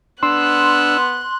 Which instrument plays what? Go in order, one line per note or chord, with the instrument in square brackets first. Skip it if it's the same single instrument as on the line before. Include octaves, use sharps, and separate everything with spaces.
[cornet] B3 [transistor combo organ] D4 E6 [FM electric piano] C6 [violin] F#6